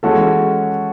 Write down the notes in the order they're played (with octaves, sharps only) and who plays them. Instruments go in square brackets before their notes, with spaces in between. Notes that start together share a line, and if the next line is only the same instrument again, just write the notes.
[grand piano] E3 G#3 C#4 F#4 A4